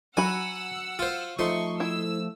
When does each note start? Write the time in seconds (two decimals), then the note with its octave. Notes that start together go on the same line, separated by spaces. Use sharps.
0.17 F#3 F#4 F#5 G#5 B5 E6
0.99 F4 C5
1.39 F3 A3 D#4 C6 C#6
1.80 E4 E6